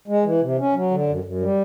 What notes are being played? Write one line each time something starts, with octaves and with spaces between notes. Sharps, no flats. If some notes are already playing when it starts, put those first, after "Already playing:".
G#3
E3
C3
C#4
F#3
D3
F#2
F#2
G3